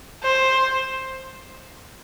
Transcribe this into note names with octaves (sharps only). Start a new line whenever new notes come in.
C5